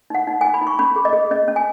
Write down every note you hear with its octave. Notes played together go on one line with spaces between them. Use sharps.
D#4 F#5
D#4
G#5
D#4
B5
D#4
C#6
C#4 B5
G#4
D#5
G#4
C#4 D#5
C#4
G#5